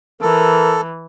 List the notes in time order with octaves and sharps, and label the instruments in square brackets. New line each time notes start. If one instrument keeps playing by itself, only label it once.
[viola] E3 [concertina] A4 [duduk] A#4